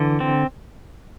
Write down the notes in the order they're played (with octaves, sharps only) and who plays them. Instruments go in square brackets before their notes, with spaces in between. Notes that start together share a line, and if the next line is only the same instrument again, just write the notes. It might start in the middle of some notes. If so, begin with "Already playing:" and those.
Already playing: [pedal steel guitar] D3 E3
C4